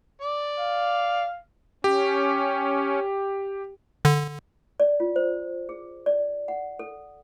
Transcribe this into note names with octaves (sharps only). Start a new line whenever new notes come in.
D5
F5
C#4 G4
D3
D5
F4
C5
G#4
D5
F#5
A4